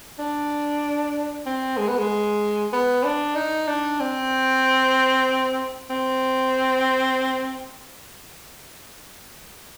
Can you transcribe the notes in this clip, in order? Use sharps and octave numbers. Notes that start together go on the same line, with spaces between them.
D4
C4
G#3
B3
G#3
B3
D4
D#4
D4
C4
C4